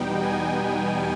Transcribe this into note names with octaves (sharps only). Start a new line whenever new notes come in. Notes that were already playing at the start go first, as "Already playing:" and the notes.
Already playing: E2 B2 G3 B3 D#4 G5
G#5